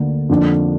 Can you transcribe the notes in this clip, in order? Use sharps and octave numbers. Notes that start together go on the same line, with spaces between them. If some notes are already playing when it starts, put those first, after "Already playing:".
Already playing: D2 D3 A#3
F2 D3 A#3 D4